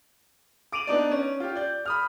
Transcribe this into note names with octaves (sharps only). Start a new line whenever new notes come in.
D6 D7 D#7 F7 F#7
B3 D4 D#4 D5
C#4
F4 G4
D5 G6
B5 D#6 F6